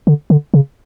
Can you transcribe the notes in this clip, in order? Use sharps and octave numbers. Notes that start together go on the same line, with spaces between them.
D3
D3
C#3